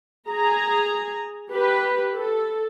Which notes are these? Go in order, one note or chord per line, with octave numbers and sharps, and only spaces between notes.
G#4 A#5
G4 B4
A4